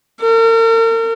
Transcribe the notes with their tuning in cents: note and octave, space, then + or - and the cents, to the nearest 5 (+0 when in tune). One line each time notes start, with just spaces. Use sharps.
A#4 -40